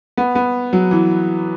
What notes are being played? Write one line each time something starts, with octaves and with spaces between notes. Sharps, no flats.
B3
B3
F#3
E3